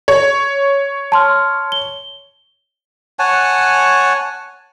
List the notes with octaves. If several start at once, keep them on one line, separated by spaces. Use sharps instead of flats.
C#5
A5 C6 F6
G7
C#5 F#5 G#5 A5